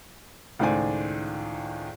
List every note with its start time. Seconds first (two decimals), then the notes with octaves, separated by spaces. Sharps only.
0.59 C#2 A2 D#3 C5 D5 G#5